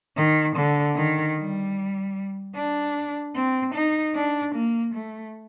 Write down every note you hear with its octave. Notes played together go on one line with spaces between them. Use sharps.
D#3
D3
D#3
G3
D4
C4
D#4
D4
A#3
A3